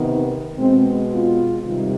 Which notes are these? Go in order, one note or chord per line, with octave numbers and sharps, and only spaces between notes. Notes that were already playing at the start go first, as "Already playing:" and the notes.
Already playing: C3 D#3 B3
B2 G#3 B3 C4
F4
C3 D#3 G3